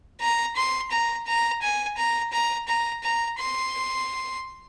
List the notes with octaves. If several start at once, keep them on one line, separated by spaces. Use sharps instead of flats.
A#5
C6
A#5
A#5
G#5
A#5
A#5
A#5
A#5
C6